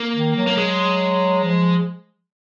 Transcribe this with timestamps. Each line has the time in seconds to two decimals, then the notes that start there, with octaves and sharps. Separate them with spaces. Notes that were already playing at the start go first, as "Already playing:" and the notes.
Already playing: A#3
0.15 D#3
0.36 F#3
0.47 A#3
0.57 G#3
1.44 F3